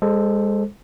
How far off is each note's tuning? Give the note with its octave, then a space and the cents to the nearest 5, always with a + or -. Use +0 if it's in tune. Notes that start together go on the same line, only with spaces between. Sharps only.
G#3 -25 A4 +0 C5 +0